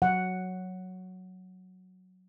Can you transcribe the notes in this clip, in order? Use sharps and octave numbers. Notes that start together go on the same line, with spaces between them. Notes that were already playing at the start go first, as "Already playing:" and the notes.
F#3 F#5